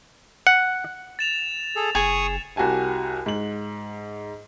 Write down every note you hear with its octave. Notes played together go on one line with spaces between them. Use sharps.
F#5
A6 E7 F7
G#4 A4
F#1 G#4 C#6 D#6
C2 F#4 G4 G#5 A5
G#2 F#7